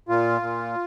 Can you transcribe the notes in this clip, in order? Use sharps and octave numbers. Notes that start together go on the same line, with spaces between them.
A#2 F4
A#2